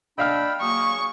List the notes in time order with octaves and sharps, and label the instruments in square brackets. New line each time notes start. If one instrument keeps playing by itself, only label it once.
[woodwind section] D4 [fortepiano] D#5 F5 F6 [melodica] G5 B5 E6
[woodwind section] F#3 A#3 [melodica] G#4 [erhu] C#6